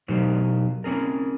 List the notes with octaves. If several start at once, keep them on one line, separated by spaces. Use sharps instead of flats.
B2 F#3 D#4 G4 A#4 C5
C4 C#4 G#4 A#4